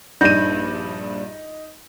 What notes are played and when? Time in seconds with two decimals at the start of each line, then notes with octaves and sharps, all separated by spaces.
0.21 A#1 G2 D4 D#4 G6 A#6 D#7